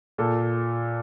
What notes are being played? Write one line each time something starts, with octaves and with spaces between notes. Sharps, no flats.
A#2 A4